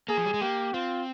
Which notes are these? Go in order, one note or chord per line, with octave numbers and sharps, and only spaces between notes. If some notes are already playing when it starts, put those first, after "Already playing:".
A#3 G#4
F3
G3
G#3
A#3 G4
C4 F4